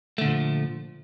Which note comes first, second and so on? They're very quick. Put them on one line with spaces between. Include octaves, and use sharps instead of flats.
A3 D3 A#2 F3